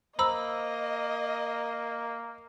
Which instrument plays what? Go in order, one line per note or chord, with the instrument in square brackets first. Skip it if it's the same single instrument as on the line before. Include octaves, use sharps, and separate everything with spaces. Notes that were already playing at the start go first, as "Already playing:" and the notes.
[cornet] A#3 [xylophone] C5 B5 E6 [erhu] D#5 [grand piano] A#5